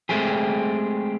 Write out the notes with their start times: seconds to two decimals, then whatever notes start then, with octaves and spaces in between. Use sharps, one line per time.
0.09 G#3 A3 C4 G4 G#4